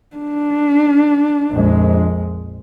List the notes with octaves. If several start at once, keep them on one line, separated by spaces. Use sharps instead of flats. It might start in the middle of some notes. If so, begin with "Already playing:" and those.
D4
A#1 F2 G#3